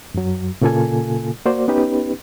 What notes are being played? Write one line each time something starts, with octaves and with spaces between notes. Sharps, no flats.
F#2 F#3
A#2 C#3 A#3 F4 A4 G#5
A#3 F#4 C5 D5
B3 C#4 D#4 G4 B4